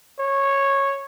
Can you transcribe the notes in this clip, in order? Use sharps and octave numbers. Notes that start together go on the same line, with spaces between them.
C#5